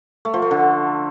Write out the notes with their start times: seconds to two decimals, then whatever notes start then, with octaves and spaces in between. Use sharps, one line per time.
0.25 A3
0.34 F3
0.42 A3
0.51 D3